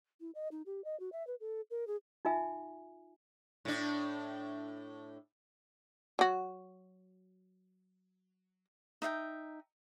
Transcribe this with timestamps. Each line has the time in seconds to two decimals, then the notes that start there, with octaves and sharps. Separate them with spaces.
0.21 E4
0.35 D#5
0.52 D#4
0.66 G4
0.84 D#5
1.00 F#4
1.12 E5
1.27 B4
1.40 A4
1.71 A#4
1.87 G#4
2.25 D#4 F4 E5 G#5
3.65 A2 D4
6.19 F#3 F#4
9.02 D#4 E5 F5 G5